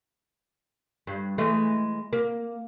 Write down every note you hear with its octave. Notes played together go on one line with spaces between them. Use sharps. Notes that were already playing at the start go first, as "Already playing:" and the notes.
G2
E3 G#3 A3
A#3